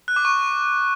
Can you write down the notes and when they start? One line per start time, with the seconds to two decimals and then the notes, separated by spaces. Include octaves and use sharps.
0.08 F#6
0.16 D6
0.25 C#6